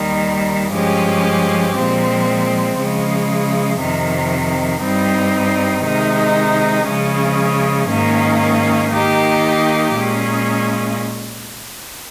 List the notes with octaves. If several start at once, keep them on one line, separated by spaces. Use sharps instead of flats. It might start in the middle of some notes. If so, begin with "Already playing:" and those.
Already playing: D#2 D#3 G3
G2 F3 G#3 C#4 G4
A#2 F3 G#3 C4
C#3 F3 G#3
F2 C3 D#3
G2 G3 C4 D#4
C3 D#3 G#3 D#4
C#3 F3 G#3 C#4
G#2 D#3 A#3 C#4
D#3 A#3 D#4 G4
A#2 G#3 C#4